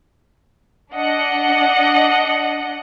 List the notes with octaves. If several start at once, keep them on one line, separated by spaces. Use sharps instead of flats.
D4 D#5 F#5 C#7